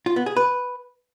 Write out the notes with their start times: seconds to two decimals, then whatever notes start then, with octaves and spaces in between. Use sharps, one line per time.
0.06 F4
0.16 B3
0.26 G#4
0.36 B4